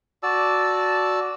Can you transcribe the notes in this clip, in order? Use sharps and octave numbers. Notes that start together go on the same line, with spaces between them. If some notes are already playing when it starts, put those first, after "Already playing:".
F#4 D5 A5 E6